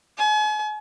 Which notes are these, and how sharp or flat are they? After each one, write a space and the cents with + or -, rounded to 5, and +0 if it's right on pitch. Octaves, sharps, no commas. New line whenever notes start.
G#5 +40